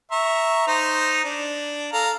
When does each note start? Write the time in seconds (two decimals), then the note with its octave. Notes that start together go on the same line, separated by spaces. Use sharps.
0.12 E5 A#5 C#6
0.67 D#4 C5 A#5
1.25 D4
1.93 A4 F5 A#5